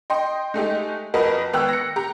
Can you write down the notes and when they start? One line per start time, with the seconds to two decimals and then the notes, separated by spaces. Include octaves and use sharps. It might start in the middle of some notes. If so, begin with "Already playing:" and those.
0.10 D#5 G5 C6
0.54 G#3 A3 D#4 G4
1.14 F2 F#4 A#4 B4 D#5
1.53 G#1 B3 G5 E6 F#6
1.69 A#6 C#7
1.96 G4 A#5